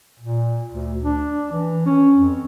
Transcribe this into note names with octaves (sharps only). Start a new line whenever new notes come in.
A#2
D2
D4
E3
C#4
F2